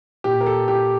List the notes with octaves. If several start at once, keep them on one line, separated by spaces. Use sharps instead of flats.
A#2 G4
A#4
A4
G4